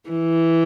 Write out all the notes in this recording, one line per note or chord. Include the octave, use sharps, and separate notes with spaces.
E3